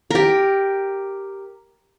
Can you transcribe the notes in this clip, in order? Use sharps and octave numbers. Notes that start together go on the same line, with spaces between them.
G4 A#4